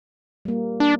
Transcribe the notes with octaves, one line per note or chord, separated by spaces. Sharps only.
G3 A#3
D4